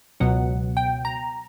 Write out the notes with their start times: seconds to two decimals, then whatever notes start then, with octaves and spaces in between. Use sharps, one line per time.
0.20 C#2 B2 F#3 B3 F#5
0.77 G5
1.05 A#5